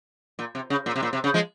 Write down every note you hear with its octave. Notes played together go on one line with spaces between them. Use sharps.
A#2
C3
C#3
A#2
C3
A#2
C3
C#3
F3 G#3